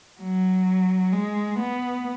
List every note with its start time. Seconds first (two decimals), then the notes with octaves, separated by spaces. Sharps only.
0.21 F#3
1.12 G#3
1.59 B3